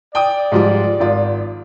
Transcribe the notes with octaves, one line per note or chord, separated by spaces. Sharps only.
D5 G5 D#6
G#2 F3 G3
G#1 F4